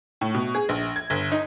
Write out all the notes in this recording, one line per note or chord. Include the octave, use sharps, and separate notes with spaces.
A2
B2
G#4
A#1
G#6
G1
D#4